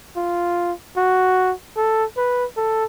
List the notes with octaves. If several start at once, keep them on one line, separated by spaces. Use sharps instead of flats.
F4
F#4
A4
B4
A4